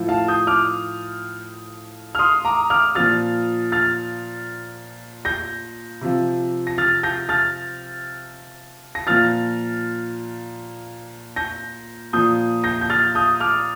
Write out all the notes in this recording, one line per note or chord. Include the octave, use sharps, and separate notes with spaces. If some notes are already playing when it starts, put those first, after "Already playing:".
Already playing: A2 F3
F5 A5
D#6 G6
D6 F6
F6
C6 D#6
A#5 D6
D6 F6
A#2 F3 F6 A6
F6 A6
G6 A#6
C3 F3
A#6
F6 A6
G6 A#6
F6 A6
A#6
A#2 F3 F6 A6
G6 A#6
A#2 F3 D#6 G6
G6 A#6
G6
F6 A6
D#6 G6
D6 F6